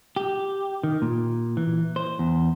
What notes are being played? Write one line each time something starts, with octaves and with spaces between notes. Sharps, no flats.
G4
D#3
A#2
E3
C5
E2